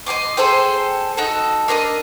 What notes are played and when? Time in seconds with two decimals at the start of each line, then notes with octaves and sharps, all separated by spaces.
0.06 D#5 G#5 C6 D6
0.37 G#4 A4 C5 G5
1.17 D#4 F#4 A4
1.68 D4 A#4 B4 D#5